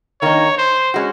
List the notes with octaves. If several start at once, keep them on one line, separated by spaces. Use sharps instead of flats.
D#3 A#3 D#4 C#5
C5
G#3 C#4 F#4